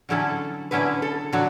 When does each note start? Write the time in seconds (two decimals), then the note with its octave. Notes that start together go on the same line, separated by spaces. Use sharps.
0.09 D3 F#3 C#4 E4 A4
0.71 D3 F#3 C#4 E4 B4
1.02 A4
1.33 D3 F#3 F#4